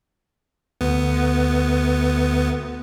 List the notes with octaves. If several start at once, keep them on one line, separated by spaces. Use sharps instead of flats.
D2 B3